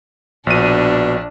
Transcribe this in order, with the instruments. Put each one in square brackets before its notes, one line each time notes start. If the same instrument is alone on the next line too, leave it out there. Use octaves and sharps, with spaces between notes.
[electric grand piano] A#1 D#7 [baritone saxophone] B2 [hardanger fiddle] D4